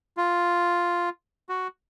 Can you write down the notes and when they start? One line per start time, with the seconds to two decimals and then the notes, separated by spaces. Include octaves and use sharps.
0.17 F4
1.49 F#4